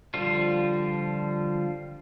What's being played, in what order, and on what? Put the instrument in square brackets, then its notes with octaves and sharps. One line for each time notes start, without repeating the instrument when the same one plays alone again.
[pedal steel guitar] D3 F3 G3 F4